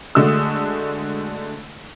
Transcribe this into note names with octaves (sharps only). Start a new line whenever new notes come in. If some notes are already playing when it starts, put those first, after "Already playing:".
D3 G#3 A3 F#4 D#6 E6